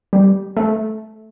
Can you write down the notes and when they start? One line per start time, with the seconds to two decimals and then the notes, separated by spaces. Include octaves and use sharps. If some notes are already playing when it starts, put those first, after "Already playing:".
0.13 G3
0.57 A3